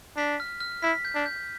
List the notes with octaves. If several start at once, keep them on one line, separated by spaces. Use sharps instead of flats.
D4 B6
F6
F6
E4 B6
G6
D4
G6